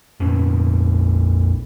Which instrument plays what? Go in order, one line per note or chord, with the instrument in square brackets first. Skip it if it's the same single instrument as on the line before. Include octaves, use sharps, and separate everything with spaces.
[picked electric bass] F2 A#2 C#4